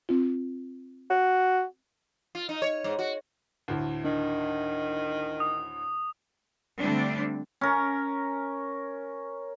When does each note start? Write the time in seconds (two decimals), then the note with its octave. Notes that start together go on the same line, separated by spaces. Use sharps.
0.09 C4 F4
1.10 F#4
2.35 F4
2.49 D#4
2.62 C#5
2.84 G#2
2.99 F#4
3.68 D2 A2
4.04 D#3 D4
5.40 D#6
6.80 D3 G3 A3 C4 D4
7.61 C#4 A#4